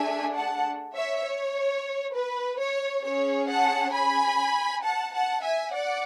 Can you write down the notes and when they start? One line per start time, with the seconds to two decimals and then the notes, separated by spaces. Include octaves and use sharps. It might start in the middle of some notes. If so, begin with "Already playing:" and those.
Already playing: A3 D4 G#4 E5 G#5
0.34 F#5 A5
0.95 C#5 E5
1.24 C#5
2.14 B4
2.59 C#5
3.04 C#4 G#4 C#5
3.49 F#5 A5
3.94 G#5 B5
4.84 F#5 A5
5.14 F#5 A5
5.44 E5 G#5
5.74 D5 F#5